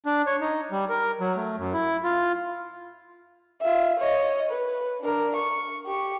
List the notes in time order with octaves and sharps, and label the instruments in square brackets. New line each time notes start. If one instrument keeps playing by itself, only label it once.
[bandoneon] D4
C#5
D#4
G3
A#4
F#3
A3
F#2
E4
F4
[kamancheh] F4 E5
C#5 D#5
B4
D4 A#4
C#6
G4 C#6